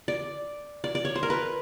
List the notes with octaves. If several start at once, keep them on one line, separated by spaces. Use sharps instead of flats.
D5
D5
D5
C#5
C5
A#4
B4